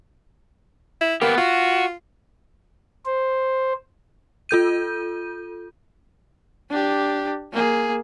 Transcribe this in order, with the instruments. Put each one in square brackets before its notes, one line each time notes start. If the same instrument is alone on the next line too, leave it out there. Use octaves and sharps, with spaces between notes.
[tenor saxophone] E4
[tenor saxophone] A#3 [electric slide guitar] B3 G4
[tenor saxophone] F4 [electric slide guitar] F#4
[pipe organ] C5
[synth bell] F4 A4 G6 D#7
[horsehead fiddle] D4 G4
A#3 G#4